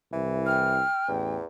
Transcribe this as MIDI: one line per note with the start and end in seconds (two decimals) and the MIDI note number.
0.12 0.82 36
0.12 0.78 52
0.46 1.35 79
0.46 1.08 89
1.08 1.38 33
1.08 1.45 40